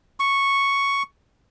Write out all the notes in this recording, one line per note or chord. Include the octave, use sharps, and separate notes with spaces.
C#6